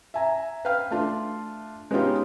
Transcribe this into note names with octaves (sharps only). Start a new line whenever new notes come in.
E5 G#5 A#5
B4 F5 G5 F6
A3 D4 F4
G#3 B3 C#4 D#4 F4 G4